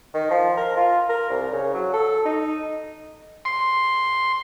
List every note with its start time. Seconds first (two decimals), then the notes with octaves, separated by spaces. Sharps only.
0.14 D#3
0.31 F3
0.57 A#4
0.77 F4
1.09 A#4
1.30 C2
1.53 C#3
1.74 F#3
1.94 A4
2.26 D#4
3.45 C6